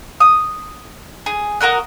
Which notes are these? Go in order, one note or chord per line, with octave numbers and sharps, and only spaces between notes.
D#6
G#4
F#4 A#4 D#5 F#6